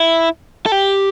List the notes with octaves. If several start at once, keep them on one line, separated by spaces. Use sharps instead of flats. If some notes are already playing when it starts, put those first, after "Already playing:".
Already playing: E4
A4
G4